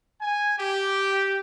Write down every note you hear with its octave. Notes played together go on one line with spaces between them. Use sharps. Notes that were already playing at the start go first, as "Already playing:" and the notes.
G#5
G4